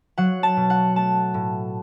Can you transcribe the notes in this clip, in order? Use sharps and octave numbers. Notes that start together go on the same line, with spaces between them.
F#3 F#5
A5
B2
F#5
A3 A5
A2